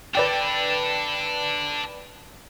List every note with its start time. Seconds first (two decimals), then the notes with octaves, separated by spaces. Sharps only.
0.15 D4 A4 B4 D5 G5